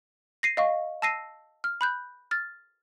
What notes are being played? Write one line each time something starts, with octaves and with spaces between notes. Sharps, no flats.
A#6 C7 D#7
D#5 F5 C#6
A5 E6 A#6 C7 D#7
F6
B5 F#6 G6
F6 A6